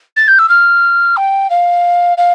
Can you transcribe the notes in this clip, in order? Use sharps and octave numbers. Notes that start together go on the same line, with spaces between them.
A6
G6
E6
F6
G5
F5
F5